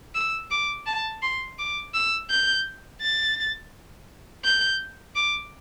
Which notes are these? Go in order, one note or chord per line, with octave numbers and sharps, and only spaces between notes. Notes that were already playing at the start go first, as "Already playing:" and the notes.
E6
D6
A5
C6
D6
E6
G6
A6
G6
D6